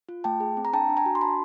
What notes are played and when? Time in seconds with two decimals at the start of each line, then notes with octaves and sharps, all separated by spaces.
0.09 F4
0.24 A3 G5 A5
0.40 G#4
0.57 C4
0.65 A#5
0.73 D4 G5 A5
0.89 D4
0.97 G#5 A#5
1.06 F#4
1.15 C6
1.21 D4 A5 B5